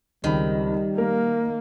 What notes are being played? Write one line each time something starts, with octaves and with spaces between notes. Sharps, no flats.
C#2 D#3 G3 C4 B5
A#3 A#4